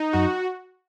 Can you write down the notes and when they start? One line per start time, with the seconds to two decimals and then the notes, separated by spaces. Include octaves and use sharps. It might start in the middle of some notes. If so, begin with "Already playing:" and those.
Already playing: D#4
0.13 F#2 F#4